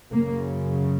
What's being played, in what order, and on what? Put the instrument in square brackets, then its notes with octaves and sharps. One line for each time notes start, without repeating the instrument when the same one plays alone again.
[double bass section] F#2 C#3 A#3